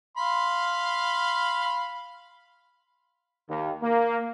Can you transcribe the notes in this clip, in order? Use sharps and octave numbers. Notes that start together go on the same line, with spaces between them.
F5 B5 C6
D#2
A#3